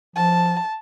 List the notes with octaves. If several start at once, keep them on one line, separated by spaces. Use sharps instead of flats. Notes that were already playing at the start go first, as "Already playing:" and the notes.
F3 A5